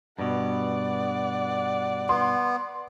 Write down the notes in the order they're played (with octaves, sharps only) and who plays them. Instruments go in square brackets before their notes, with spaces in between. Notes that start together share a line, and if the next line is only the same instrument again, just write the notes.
[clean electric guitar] G2 B2 [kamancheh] D5 F#5
[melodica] B3 [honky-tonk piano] C6